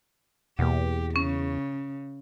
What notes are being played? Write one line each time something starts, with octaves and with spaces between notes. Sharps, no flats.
E2 B2 A#3 G4
C#3 C#4